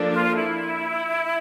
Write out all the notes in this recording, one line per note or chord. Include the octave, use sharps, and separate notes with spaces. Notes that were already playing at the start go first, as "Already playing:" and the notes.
Already playing: F3 A#3 D4 A4
F4
E4